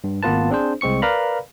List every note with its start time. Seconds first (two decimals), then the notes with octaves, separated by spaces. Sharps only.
0.04 G2
0.23 G#1 A#3 B3 F4 B4 A5
0.50 C4 D4 G#4 C5
0.81 C2 G#3 C4 C#6 C#7
1.02 A#4 B4 D5 F5 A#5 B5